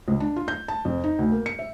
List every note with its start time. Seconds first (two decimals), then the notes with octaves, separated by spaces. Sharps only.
0.08 C#2
0.20 D4
0.36 F4
0.48 G6
0.68 A5
0.85 F2
1.04 D#4
1.19 D2
1.32 A#3
1.46 C#7
1.59 E5